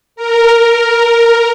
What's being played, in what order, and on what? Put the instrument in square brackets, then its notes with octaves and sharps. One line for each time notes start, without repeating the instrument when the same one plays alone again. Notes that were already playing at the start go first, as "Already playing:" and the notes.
[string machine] A#4